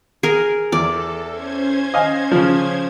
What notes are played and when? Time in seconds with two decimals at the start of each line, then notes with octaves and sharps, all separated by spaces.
0.23 G#4 A#4
0.72 E2 A4 D5
1.30 C#4 C5 G#6
1.94 D#5 F5 G#5
2.32 C#3 F3